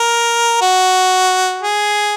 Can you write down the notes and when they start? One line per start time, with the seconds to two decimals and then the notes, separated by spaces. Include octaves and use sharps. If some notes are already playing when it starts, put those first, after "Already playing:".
Already playing: A#4
0.61 F#4
1.63 G#4